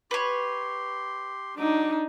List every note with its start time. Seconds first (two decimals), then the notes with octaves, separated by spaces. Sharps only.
0.11 G4 B4 C#5 C6
1.57 F#3 D4 D#4 D6